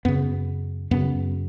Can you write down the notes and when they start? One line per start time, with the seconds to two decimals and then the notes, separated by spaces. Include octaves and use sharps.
0.05 F#2 C#3 B3
0.91 F#2 C#3 B3